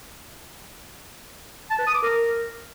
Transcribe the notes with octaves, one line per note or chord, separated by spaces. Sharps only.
A5
B4
D#6
D6
A#4